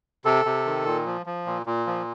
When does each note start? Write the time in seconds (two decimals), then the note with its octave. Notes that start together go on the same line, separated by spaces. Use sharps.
0.25 C3 A4
0.45 C3
0.65 D#3
0.85 A#2
1.06 F3
1.26 F3
1.46 A#2
1.66 A#2
1.87 F3